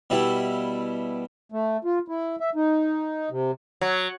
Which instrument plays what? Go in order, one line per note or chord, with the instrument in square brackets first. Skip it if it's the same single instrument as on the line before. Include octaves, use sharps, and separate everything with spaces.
[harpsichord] B2 G3 E4
[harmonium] A3
F4
E4
E5
D#4
C3
[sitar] F#3